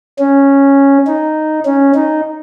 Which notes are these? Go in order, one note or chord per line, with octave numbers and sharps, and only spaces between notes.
C#4
D#4
C#4
D#4